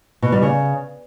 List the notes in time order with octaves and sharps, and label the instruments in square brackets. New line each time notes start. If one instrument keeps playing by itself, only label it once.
[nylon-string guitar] B2
G3
C#3